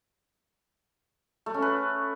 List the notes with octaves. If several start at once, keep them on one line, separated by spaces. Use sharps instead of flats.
A3
C#4
B4